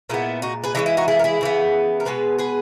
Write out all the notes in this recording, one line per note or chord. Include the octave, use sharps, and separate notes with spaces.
A#2 G#3 B3 E4
D#4 F#4
G#4 B4
E3 G#3 C#4 D#4
E4
D#4 F#4
E4 G#4
A#4
E4 G#4
C#3 E3 B3
A#4
B2 G#3 B3 G#4 B4
G#4 B4